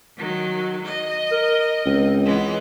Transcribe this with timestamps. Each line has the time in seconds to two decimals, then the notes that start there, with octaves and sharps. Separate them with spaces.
0.16 D#3 F#3
0.83 D#5
1.32 A#4
1.86 C#2 C4
2.25 E3 G#3 B3